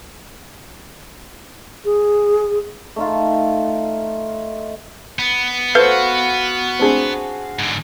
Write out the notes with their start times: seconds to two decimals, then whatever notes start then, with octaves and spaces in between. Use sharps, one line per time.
1.85 G#4
2.96 A3 D#4 F4
5.19 B3
5.75 F#4 A4 B4 C5 F5
6.79 C4 D4 G#4
7.59 G#2 D3